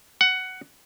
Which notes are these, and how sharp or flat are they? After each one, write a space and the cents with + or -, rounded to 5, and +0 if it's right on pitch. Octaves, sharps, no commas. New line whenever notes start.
F#5 +10